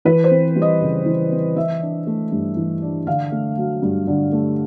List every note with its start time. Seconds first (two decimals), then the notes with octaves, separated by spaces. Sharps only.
0.05 E3 B4
0.24 C5
0.31 C4
0.56 G3
0.62 D#5
0.81 C#3
1.06 E3
1.31 C4
1.56 E3 E5
1.81 D4
2.07 A3
2.32 G2
2.57 E3
2.82 D4
3.07 D3 F5
3.32 A3
3.57 F#3
3.82 G2
4.07 D3
4.32 A3